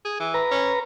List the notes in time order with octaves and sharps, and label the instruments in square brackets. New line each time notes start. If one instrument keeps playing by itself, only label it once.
[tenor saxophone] G#4
E3
[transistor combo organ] B4 A#5
[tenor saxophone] C#4